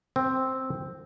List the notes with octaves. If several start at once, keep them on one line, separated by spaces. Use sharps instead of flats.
C4